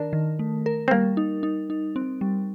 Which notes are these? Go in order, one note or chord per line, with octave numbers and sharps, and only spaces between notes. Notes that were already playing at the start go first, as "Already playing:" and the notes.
Already playing: D#3 D4 A#4
D#3
A3
A#4
C4
G3 A#3
D#4
D#4
D#4
C4
G3